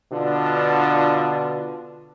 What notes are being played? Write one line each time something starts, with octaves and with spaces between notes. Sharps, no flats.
B2 D3 D4 F4